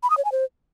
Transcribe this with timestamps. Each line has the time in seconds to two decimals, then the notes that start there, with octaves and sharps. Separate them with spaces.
0.03 B5
0.10 D#6
0.17 C#5
0.25 G#5
0.32 C5